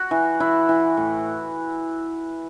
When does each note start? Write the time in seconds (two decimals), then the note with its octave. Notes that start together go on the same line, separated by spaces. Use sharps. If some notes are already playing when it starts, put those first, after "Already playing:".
Already playing: F#4
0.11 E3
0.40 E3 E4
0.69 E3
0.97 A2